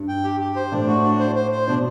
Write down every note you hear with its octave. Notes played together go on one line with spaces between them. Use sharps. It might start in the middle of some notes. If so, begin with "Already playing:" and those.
Already playing: G2
G5
G4
G4
C5
A2 D4
F#4
D4
C5
C5
C5
B2 D4